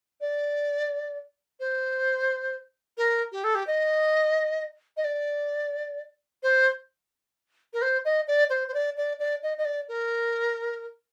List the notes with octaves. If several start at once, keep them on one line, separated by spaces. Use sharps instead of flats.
D5
C5
A#4
G4
A4
G4
D#5
D#5
D5
C5
A#4
C5
D#5
D5
C5
C5
D5
D5
D5
D#5
D#5
D5
A#4